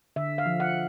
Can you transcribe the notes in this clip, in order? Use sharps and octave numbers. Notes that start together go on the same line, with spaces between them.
D3 E5
F5
F3
F#5